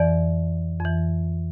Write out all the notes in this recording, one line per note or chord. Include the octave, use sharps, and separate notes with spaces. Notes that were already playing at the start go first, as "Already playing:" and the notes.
Already playing: F2 E3 D5
F2 E3